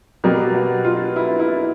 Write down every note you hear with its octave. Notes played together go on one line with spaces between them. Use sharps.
B2 F#3 A#3 G4
F#4
F4
E4
E4